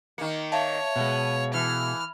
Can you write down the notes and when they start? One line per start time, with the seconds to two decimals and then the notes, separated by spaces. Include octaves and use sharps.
0.18 D#3 A#3 C#7
0.52 C#5 E5 F5 A5
0.96 B2 G#3 B3
1.54 E3 F6